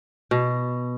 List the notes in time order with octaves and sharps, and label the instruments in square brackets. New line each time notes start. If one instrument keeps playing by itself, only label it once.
[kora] B2